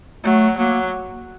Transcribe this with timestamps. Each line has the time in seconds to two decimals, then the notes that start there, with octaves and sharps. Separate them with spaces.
0.24 F#3 A3
0.57 F#3 A#3